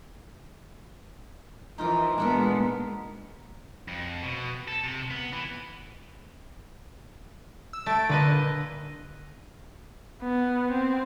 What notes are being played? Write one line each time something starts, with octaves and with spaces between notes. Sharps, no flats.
E3 F3 D#4 F4 A#4
A#2 G#3 B3 D4 A4 A#4
F2
B2
A4
C3
B3
E3
E6
A3 D7
A#2 D3 B4 D#5
B3
C4